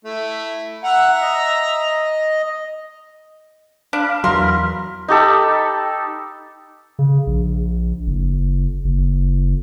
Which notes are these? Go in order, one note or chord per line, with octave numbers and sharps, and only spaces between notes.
A3 E4
E5 F#5 A#5
D#5
D4 F5 B5
E2 F#3 A#4 C6
D#4 G4 A4 B5
C#3
A#1
F#1
F#1